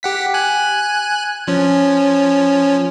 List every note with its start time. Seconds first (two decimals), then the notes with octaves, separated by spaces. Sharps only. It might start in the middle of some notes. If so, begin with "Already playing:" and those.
0.03 G4 F#5 B6
0.34 G#5 F#6
1.47 F3 C#4